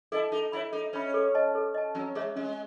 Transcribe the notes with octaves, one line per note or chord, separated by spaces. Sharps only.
E4 A4 D#5 A5
D#4 A4
E4 C#5 E5 B5
D#4 A4
C#4 C#5 E5 B5
A4
D#5 A5
A4
D#5 A5
F#3 C#4
G#3 G#4 C#5 E5
G#3 C#4